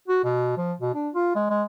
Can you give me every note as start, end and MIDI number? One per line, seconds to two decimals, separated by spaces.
0.08 0.21 66
0.24 0.53 47
0.57 0.73 53
0.81 0.93 47
0.94 1.09 62
1.14 1.31 65
1.35 1.48 56
1.50 1.63 56